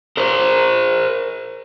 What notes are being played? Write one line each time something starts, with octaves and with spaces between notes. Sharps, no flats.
A#4 C5